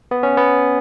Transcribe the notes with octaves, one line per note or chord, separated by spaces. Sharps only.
B3
C#4
B3